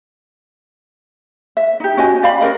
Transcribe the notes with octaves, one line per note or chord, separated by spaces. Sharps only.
E5
D#4 G4
C#4 F#4 D#5 G#5
G4 D5 F5 B5
C#4 F4 A#4 D#5